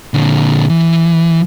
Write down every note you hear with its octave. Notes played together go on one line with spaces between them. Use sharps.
A#2 D3
E3